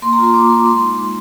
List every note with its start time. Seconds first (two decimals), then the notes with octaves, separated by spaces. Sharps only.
0.02 A#3 C6
0.13 A#5
0.18 F4
0.24 C6
0.34 A#3 D6
0.49 F4 C6
0.66 G#3 C6
0.76 C6
0.82 D#4
0.87 C6
0.97 G#3